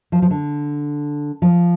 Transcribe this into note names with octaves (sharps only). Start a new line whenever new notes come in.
F3
F3
D3
F3